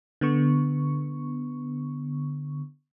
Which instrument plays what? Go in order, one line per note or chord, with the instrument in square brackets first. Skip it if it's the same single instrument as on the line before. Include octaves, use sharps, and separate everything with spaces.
[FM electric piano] D3 B3 C#6